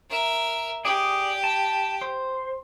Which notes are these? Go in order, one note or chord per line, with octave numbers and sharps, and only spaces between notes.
A#4 E5
G4 G#4 D5
A5
C5